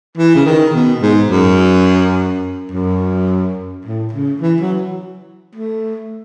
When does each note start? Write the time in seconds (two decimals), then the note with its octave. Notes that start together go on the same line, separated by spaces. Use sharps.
0.17 E3
0.35 C#3
0.45 D#3
0.74 B2
1.02 G#2
1.30 F#2
2.72 F#2
3.85 A2
4.13 C#3
4.41 E3
4.61 F#3
5.55 A3